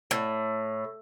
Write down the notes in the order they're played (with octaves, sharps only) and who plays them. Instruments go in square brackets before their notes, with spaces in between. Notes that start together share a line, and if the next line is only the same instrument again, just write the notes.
[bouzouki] A2